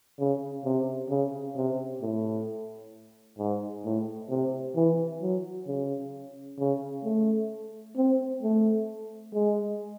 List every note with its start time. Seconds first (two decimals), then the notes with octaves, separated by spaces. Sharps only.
0.19 C#3
0.65 C3
1.10 C#3
1.56 C3
2.02 A2
3.38 G#2
3.85 A2
4.30 C3
4.76 E3
5.22 F#3
5.67 C#3
6.59 C#3
7.05 A3
7.97 C4
8.43 A3
9.34 G#3